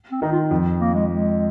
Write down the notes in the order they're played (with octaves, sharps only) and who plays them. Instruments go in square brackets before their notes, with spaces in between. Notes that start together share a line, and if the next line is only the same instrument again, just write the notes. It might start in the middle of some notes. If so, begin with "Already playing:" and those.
[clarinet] C4
[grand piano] D#3 [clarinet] D#4
[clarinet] F4
[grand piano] F2
[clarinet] A#3
G#3
G#3